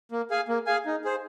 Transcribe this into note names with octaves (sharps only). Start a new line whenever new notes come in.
A#3
G#4 F5 G#5
A#3
G#4 F5 G#5
D#4
G#4 C5